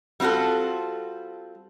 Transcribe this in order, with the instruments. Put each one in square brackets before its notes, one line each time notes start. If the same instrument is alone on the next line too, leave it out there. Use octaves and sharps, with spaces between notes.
[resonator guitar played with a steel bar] G3 C4 F4 F#4 A4